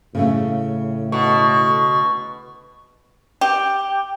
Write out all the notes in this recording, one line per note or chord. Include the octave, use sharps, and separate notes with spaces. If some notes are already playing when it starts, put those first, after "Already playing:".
A2 C#3 A3
B2 C#6
G4